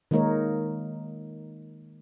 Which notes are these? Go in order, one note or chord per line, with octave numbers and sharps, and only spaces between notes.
D#3 G#3 A#3 D#4 A#4 C#5